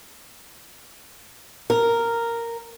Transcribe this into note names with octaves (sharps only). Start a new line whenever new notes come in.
A#4